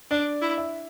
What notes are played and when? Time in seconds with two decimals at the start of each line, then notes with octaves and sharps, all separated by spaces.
0.11 D4 D5
0.42 E4
0.57 E5